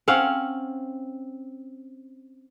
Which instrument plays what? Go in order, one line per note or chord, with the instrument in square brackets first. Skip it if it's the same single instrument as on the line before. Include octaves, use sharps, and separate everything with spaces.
[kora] C4 C#4 F5 F#5